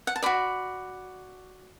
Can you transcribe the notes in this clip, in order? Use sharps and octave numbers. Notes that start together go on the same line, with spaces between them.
F#5
A5
F#4 D5 B5